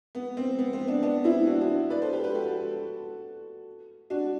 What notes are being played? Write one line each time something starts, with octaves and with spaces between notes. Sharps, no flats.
B3
C4
B3
C4
B3 D4
B3 D4
C4 E4
D4 F#4
D4 F#4
B4 D5
A4 C5
G4 B4
G4 B4
F#4 A4
D4 F#4